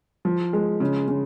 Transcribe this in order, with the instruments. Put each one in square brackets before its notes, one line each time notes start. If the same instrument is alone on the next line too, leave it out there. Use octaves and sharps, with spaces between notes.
[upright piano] F3
G#3
C#3
C#3